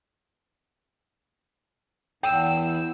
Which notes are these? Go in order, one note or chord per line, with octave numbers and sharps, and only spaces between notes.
E2 G5 E6